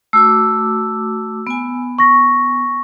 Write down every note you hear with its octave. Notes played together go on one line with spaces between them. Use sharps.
A3 F#4 D6 E6
B3 G#5
C#6 A#6